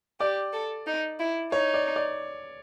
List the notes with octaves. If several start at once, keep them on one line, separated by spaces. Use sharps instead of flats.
G4 D5
A4
D#4
E4
D#4 C#5
D5
D5